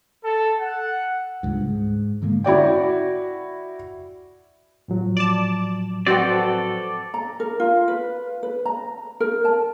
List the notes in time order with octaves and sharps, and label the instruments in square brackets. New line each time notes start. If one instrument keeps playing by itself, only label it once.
[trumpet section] A4
F#5
[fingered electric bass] C#2 G2
G#2
G#2 D3 G#3 A#3
[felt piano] E4 F#4 D5 G5
[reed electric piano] A2 F3 F#3
[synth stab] D5 A5
[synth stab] C4 [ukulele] F#4 B4 F#5 [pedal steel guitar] A4 D5
[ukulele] A#5
A#4
F4
B4
B4
A#5
A#4
A5